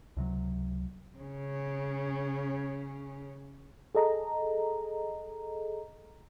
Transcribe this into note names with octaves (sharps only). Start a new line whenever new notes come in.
C#2 C3 F#3
C#3 C#4
G#4 A4 D#5 A#5